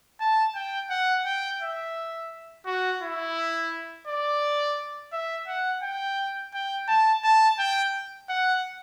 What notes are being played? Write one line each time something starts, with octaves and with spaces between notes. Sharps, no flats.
A5
G5
F#5
G5
E5
F#4
E4
D5
E5
F#5
G5
G5
A5
A5
G5
F#5